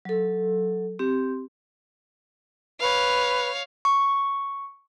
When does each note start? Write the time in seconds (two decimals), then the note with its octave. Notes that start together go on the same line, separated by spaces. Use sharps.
0.05 F#3 A4
0.99 C4 G4
2.79 B4 C#5 F5
3.85 C#6